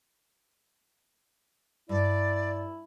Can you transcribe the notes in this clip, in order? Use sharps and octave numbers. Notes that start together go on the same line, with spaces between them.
G2 E4 D5